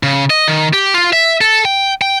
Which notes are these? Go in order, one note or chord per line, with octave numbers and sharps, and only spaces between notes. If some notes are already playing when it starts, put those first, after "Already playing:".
C#3
D#5
D#3
G4
F4
E5
A4
G5
G5